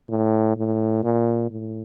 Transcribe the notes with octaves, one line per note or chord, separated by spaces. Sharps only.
A2
A2
A#2
A2